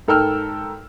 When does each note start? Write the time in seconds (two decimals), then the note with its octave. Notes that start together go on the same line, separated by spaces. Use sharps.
0.08 G#2 A4 A#4 G5 E6 F6